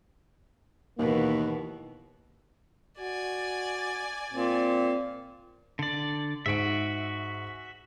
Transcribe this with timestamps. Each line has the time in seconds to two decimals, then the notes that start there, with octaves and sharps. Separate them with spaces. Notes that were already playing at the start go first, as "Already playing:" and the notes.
0.99 D#2 B2 E3 A#3 B3
3.00 F#4 D5 G#5
4.33 A#2 C4
5.79 D3 D5
6.46 G#2 F#4 E5 D7